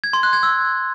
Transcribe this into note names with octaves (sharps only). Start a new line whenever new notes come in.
G#6
C6
F#6
G#6
E6